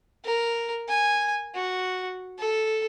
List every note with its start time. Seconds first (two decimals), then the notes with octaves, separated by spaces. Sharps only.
0.25 A#4
0.89 G#5
1.55 F#4
2.38 A4